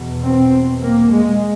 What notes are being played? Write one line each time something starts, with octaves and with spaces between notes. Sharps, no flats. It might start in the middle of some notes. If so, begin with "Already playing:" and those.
Already playing: E2 B2
C4
A#3
G#3